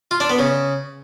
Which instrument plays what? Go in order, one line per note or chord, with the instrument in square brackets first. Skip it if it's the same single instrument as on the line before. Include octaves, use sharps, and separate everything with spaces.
[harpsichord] F4
D4
B3
C#3